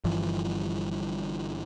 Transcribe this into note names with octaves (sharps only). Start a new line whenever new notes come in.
G1 G2 E3 F3